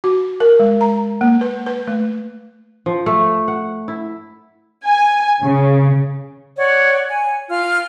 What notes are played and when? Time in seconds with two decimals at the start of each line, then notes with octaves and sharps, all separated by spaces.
0.04 F#4
0.40 A#4
0.60 G#3
0.81 A#5
1.21 A#3
1.41 B4
1.66 B4
1.88 A3
2.86 F3
3.06 A3
3.48 F#5
3.88 E4
4.85 G#5
5.42 C#3
6.57 C#5 D5 F#5
7.08 G#5
7.49 F4 F6